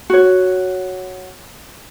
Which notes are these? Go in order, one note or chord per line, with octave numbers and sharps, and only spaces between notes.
F#4 C#5